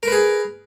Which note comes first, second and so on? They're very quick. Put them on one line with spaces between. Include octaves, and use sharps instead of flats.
A#4 B4 G#4